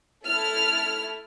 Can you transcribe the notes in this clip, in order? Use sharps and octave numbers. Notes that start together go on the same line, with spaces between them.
A3 E4 A4 F6